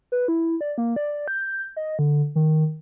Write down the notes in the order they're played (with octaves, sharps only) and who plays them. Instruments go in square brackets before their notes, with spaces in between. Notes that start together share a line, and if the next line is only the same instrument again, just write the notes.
[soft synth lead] B4
E4
D5
A#3
D5
G6
D#5
D3
D#3